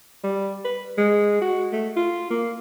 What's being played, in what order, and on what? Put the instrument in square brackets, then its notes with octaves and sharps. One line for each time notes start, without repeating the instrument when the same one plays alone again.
[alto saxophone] G3
B4
G#3
F#4
A3
F4
A#3